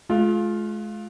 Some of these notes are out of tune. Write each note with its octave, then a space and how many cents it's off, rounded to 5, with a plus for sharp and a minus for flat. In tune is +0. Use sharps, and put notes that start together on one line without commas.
G#3 +40 F4 +0